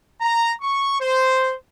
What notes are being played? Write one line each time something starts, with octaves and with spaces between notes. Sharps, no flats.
A#5
C#6
C5